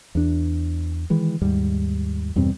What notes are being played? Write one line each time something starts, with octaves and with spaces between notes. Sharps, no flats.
E2 D4
D#3 E3 G#3
D#2 G#2 G3
E2 G2 B2 C4